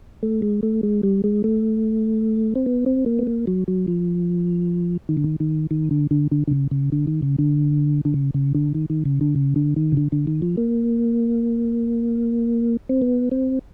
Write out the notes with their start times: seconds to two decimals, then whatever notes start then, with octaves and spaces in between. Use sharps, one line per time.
0.23 A3
0.42 G#3
0.63 A3
0.83 G#3
1.03 G3
1.24 G#3
1.44 A3
2.56 C4
2.66 B3
2.86 C4
3.06 A#3
3.19 B3
3.27 A#3
3.47 F#3
3.68 F#3
3.88 F3
5.09 D#3
5.17 D3
5.24 D#3
5.40 D#3
5.71 D#3
5.91 D3
6.11 D3
6.32 D3
6.48 D3
6.51 C#3
6.71 C#3
6.92 D3
7.07 D#3
7.22 C#3
7.38 D3
8.05 D3
8.14 C#3
8.34 C#3
8.55 D3
8.75 D#3
8.90 D#3
9.05 C#3
9.21 D3
9.36 C#3
9.56 D3
9.76 D#3
9.92 C#3
9.97 D3
10.12 D3
10.27 D#3
10.42 F3
10.57 A#3
12.89 C4
13.02 B3
13.31 C4